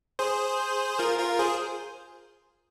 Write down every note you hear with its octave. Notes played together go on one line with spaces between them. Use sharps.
G#4 C5
F4 A#4
F4 A#4
G#4 C5